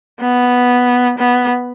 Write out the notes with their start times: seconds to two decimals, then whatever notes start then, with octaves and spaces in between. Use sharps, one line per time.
0.20 B3
1.18 B3